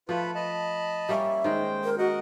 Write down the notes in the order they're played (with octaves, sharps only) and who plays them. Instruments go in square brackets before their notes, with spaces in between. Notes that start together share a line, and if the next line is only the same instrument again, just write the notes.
[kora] F3 A3 [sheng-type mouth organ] F4 B4 B5
[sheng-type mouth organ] D#5 A5 B5
[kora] G3 A#3 C#4 [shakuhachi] E5
[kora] D#3 G#3 [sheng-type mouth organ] C5 G5
[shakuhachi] A#4
[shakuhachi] F#4 [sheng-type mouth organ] A#4 D#5 F#5